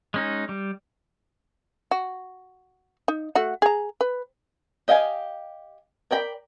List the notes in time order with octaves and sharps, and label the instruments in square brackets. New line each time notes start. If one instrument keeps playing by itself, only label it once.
[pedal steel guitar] G#3 C#4 D#4
G3
[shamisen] F#4
D#4
A3 F#4 F#5
G#4 A#5
B4
[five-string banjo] G4 D#5 F5 F#5 G#5
A#4 D5 G5 A#5 B5